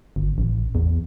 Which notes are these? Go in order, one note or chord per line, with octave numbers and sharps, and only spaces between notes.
G1
A1
E2